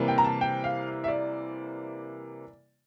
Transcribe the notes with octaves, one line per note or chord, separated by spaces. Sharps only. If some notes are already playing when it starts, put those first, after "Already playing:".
Already playing: C3 E3 G3 A#3
G5
A#5
A5
G5
F5
E5
D5